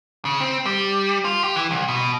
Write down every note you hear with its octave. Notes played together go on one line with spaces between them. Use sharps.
C#3
C4
G3
F4
G4
E3
C2
B2